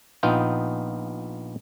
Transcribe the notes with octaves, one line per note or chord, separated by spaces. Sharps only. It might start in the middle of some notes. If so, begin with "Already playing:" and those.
A#1 B3 D#4 F4 G5